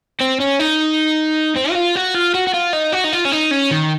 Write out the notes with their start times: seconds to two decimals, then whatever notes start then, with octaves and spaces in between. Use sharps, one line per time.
0.20 C4
0.40 C#4
0.59 D#4
1.57 C4
1.71 F#4
1.75 F4
1.96 F#4
2.15 F4
2.34 F#4
2.47 F#4
2.53 F4
2.73 D#4
2.92 F#4
3.04 D#4
3.12 F4
3.25 C#4
3.32 D#4
3.51 C#4
3.71 D#3